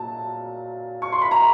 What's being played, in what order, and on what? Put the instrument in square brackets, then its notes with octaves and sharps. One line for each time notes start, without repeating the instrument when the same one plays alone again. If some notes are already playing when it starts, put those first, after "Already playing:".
Already playing: [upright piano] A#2 F#3 A5
C#6
C6
B5
A#5